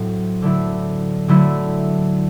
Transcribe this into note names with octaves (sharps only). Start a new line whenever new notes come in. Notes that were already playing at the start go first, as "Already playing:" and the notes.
Already playing: A2 F#3 C4
D3 F#3 A3 E4
D3 F#3 A3 E4